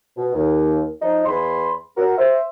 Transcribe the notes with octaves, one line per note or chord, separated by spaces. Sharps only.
B2
D#2
F3 D#4
E2 E3 B5 C6
F#4 A#4
C5 E5